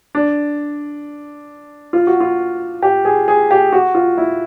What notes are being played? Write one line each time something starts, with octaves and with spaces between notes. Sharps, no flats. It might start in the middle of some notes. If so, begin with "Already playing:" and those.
D4
F4
F#4
F4
G4
G#4
G#4
G4
F#4
F4
E4